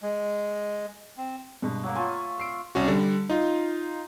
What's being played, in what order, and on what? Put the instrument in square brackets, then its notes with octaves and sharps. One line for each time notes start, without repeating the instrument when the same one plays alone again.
[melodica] G#3
C4
[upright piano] G2 B2 G#3
[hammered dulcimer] F#3 A#3
[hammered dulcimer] A3 F4 [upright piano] G#5 A5
[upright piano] E6 C7 D7
[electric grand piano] C2 C#4 F#4
D3 G3
D#4 F4